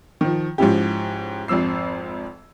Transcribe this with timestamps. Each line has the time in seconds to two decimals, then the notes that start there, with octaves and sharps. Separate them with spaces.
0.21 D#3 F3
0.58 G#2 F3 C#4 E4 G4
1.48 G#1 F2 F3 E6 C7